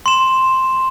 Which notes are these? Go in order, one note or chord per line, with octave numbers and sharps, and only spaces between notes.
C6 E7